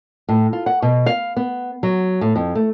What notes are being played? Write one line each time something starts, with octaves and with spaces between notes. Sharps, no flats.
A2
F4
F#5
B2
F5
B3
F#3
A2
F2
A3